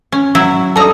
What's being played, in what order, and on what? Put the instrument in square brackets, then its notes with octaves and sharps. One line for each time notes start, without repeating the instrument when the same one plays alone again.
[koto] C#4
F#3 E4
[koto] G3 A#5 [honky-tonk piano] A4 D#6